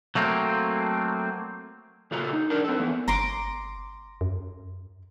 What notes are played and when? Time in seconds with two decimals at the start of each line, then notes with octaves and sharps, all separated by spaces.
0.15 F#3 A3 A#3 C4
2.11 A#2 C#3 F4 A4 A#5
2.33 D#4
2.50 D4 A#4 D5
2.65 C4 A4
2.80 E3 B3
3.08 G1 A#5 C6 D6
4.21 F#2